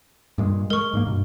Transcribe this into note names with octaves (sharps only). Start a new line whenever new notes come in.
G2 A#2 G#3
G#3 A#4 C#6
G#2 G#3 A#3
G2 B2